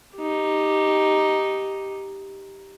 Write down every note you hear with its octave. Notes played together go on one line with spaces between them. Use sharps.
D#4 G4